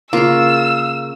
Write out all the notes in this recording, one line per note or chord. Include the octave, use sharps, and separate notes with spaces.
C#3 A#3 F4 E6